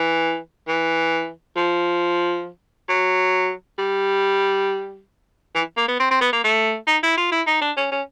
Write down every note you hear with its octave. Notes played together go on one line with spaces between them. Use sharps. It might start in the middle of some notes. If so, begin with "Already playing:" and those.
Already playing: E3
E3
F3
F#3
G3
E3
A#3
B3
C4
C4
B3
A#3
A3
D#4
E4
F4
E4
D#4
D4
C#4
C#4